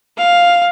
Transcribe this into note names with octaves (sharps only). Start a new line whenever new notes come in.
F5